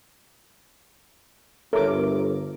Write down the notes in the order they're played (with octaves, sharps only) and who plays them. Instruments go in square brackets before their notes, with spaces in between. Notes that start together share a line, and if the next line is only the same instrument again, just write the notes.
[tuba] G1 [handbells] A4 C#5 E5 [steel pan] A#4 D6